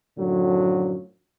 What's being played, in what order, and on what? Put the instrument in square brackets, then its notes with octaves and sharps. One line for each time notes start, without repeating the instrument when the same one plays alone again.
[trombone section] F#2 A2 D3 F3 F#3